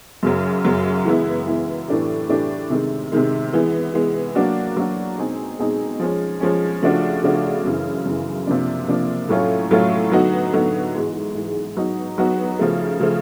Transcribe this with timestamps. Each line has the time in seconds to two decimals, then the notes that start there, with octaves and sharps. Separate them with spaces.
0.23 F#2 C#3 F#3
0.65 F#2 C#3 F#3
1.05 E3 G#3 B3 E4
1.47 E3 G#3 B3 E4
1.88 A2 E3 A3 D4 G4
2.29 A2 E3 A3 D4 G4
2.70 C3 D#3 G#3
3.12 C3 D#3 G#3
3.53 E3 G#3 B3
3.94 E3 G#3 B3
4.35 F#3 A#3 D4 F#4
4.77 F#3 A#3 D4 F#4
5.18 B2 G#3 C4 D#4 G#4
5.59 B2 G#3 C4 D#4 G#4
6.00 F3 G#3 C#4
6.41 F3 G#3 C#4
6.82 C#3 F3 A3 D4 F#4
7.24 C#3 F3 A3 D4 F#4
7.64 F#2 C#3 E3
8.05 F#2 C#3 E3
8.47 C3 F3 A#3 D4
8.88 C3 F3 A#3 D4
9.29 A2 F#3 A3 C#4 F4
9.71 A2 F#3 A3 C#4 F4
10.11 D3 F#3 B3 D#4 F#4
10.53 D3 F#3 B3 D#4 F#4
10.95 G#2 E3 G#3
11.35 G#2 E3 G#3
11.77 F#3 B3 D#4 F#4
12.18 F#3 B3 D#4 F#4
12.59 C#3 F3 A3
13.00 C#3 F3 A3